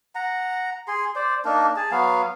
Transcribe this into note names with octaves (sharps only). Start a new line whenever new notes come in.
F#5 A#5
G#4 C6
C5 D5
A#3 D4 D#4 A#4
G#4 A5
F#3 B3 F5